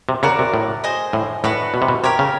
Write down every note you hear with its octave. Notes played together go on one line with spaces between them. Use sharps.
C3
C#3 F#4 A#4 D5
C3
A2
G#4 C5 D#5
A2
A2 D4 F#4 B4
B2
C3
B2
C3 G4 A#4 C#5
C#3